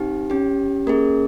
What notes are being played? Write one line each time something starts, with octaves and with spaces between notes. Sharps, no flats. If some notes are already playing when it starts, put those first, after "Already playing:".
Already playing: C4 D#4 G4
C#4 G4
A#3 C#4 G#4 A#4